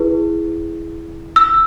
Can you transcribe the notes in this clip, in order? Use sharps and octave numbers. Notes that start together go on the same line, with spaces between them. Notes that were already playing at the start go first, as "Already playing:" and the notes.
Already playing: E4 G#4 B4
E6